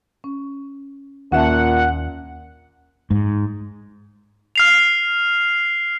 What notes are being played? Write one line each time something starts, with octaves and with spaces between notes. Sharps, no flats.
C#4
D#2 A#2 C#4 E5 F#5 A5
G#2
F6 C7 F7